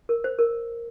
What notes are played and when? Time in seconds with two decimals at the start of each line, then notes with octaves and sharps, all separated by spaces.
0.09 A#4
0.24 C5
0.39 A#4